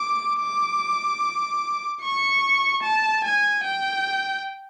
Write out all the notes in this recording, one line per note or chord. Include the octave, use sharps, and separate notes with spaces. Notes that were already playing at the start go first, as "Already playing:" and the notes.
Already playing: D6
D6
C#6
A5
G#5
G5